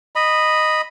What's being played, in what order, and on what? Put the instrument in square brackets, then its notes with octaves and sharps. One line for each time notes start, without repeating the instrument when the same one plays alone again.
[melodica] D#5 B5